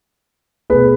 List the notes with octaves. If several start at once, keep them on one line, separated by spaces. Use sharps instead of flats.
B2 A3 G#4 B4